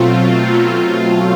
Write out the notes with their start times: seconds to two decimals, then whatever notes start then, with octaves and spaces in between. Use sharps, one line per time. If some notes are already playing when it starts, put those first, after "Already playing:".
Already playing: B2 F#3 A3 C4 F4
0.20 B2
0.53 F#3 A3 C4